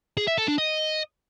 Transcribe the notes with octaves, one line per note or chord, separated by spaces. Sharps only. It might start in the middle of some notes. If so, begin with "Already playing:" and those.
G#4
E5
A4
D4
D#5